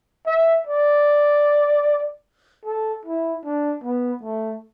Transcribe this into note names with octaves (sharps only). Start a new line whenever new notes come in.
E5
D5
A4
E4
D4
B3
A3